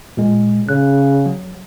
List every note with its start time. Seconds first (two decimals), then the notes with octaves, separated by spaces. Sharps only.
0.17 A#2 G#3
0.69 C#3 F#6
1.26 F#3